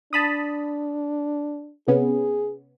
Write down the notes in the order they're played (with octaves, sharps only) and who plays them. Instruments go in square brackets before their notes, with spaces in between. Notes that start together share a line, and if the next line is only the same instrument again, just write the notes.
[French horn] D4 [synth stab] A5 B5 D#6
[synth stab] C3 B3 C#4 [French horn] G#4